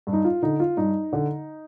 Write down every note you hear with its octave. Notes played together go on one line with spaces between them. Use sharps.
G2
D#4
F4
D3 D#4
F4
G2 D#4
D3